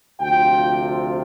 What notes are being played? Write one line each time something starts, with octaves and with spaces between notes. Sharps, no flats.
D2 C3 F3 C4 F4 G5